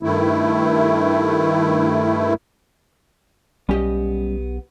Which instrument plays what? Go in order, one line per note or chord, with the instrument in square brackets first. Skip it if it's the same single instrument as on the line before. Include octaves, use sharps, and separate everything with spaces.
[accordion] G2 D#3 A3 E4
[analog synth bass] B1 [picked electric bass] G3 C#4 [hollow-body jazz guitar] B3 G4 D#5